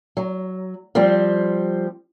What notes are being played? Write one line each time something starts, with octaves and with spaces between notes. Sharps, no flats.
F#3
F3 G3 C4